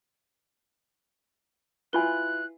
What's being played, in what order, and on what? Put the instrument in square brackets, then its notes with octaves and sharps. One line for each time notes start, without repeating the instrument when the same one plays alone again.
[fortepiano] E4 F4 B4 [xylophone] G#5 B5 G7 [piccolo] F#6